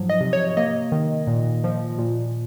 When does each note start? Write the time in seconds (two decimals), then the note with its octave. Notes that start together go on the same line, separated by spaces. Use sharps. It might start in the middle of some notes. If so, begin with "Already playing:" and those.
Already playing: G#2 F3 F#3
0.09 D#5
0.20 C3
0.33 C#5
0.57 A#3 D#5
0.92 D#3
1.27 A#2
1.64 F3
1.99 A#2